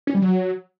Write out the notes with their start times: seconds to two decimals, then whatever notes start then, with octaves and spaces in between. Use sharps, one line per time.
0.07 C#4
0.15 G3
0.22 F#3